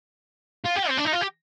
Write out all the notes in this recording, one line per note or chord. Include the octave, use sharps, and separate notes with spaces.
F4
G4
C4
D4
D#4
F4
G4